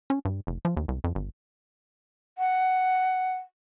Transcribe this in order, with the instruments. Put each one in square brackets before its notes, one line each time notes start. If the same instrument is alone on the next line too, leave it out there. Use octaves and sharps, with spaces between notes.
[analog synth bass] C#4
G2
F1
F3
D#2
C2
F2
G1
[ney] F#5